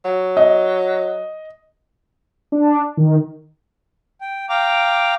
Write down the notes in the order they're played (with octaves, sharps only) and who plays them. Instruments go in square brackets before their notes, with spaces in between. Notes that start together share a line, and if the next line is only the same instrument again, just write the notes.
[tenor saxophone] F#3
[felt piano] D#5
[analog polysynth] D4
D#3
[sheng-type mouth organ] G5
F5 G5 A#5 D6